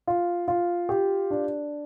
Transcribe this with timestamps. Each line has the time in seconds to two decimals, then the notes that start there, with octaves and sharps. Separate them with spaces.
0.07 F4
0.48 F4
0.89 G4
1.30 D4